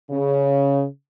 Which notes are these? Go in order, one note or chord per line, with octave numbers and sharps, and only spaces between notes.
C#3